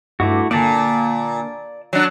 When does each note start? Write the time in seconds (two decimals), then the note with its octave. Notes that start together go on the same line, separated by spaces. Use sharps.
0.20 G2 A3 E4 F#4 D6
0.51 A#2 D3 A#3 D5 A5
1.93 F#3 D4